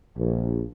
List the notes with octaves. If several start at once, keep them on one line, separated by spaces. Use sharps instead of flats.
A#1